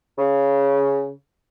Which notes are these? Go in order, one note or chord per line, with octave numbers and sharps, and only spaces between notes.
C#3